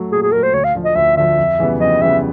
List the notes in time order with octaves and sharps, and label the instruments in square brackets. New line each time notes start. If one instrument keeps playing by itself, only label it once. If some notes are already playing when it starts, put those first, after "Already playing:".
Already playing: [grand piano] F#3 A3
[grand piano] A#2 [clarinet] G#4
[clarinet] G#4
[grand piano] F#3 A3 [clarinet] A#4
[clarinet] C5
[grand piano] D2 [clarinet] C#5
[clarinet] F5
[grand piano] D3 F3
[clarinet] D#5
[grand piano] D2 [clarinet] E5
[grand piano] D3 F3 [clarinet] E5
[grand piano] F2
C#3 E3 G3 B3
[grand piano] F2 [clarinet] D#5
[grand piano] C#3 E3 G3 B3 [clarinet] E5